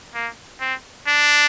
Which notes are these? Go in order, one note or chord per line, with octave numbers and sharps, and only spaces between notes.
A#3
C4
D4